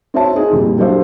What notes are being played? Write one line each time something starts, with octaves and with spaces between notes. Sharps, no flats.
C4 F#4 C5 C#5 E5 A5
C4 D#4 G#4
F2 A#2 G3
F#3 D4 G4 A4 C5 F5